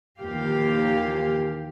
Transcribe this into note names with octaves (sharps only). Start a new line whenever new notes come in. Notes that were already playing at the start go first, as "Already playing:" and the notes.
D#2 A#2 E3 F3 G4 F5